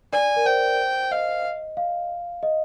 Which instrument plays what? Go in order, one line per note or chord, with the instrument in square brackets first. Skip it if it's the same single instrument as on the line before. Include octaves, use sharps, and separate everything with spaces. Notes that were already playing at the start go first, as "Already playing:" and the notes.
[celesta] D5 [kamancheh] G#5
[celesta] A#4
[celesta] C5 [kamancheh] G5
[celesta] D#5 [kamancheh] F5
[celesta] F5
D#5